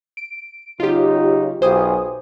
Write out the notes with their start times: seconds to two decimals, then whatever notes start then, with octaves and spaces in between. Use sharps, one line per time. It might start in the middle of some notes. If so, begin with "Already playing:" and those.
0.17 D7
0.80 C#3 F#3 D#4 F4 G4
1.62 B1 F4 G4 C5 G#5 D#6